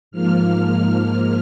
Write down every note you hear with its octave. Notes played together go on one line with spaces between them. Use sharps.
G#2 F3 A#3 F6